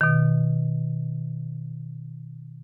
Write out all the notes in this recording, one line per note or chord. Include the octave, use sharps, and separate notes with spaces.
B2 D#3